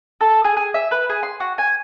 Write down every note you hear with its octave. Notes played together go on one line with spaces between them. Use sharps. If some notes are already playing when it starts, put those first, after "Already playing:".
A4
G#4
G#4
E5
B4
G#4
C6
F#4
G#5